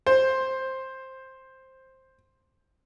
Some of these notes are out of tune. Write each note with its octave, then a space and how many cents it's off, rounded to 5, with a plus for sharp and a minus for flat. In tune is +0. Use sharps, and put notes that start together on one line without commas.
C5 +10